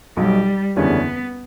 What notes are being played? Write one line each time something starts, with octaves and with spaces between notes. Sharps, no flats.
B1 B2 F#3 G3
F#1 E2 D3 G3 B3 C#4